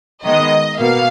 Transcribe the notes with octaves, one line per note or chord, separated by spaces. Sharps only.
D#3 G#3 B3 D#5
B2 A#3 F5